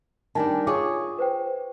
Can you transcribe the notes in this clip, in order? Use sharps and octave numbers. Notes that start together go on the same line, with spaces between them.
D#3 G3 D4 G#5 A5
F4 G#4 C#5 D6
B4 C5 G5